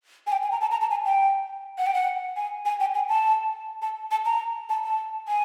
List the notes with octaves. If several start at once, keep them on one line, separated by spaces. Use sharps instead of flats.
G#5
G5
G#5
A#5
A5
A#5
A5
G#5
G5
F#5
G5
F#5
G#5
G#5
G5
G#5
A5
A5
A5
A#5
A5
A5
G#5